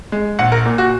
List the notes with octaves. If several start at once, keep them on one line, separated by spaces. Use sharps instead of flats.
G#3
A#1 F#5
A#4
A#2
F#4